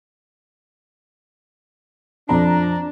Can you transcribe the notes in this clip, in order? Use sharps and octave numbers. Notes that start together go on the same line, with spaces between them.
F2 D4 A#5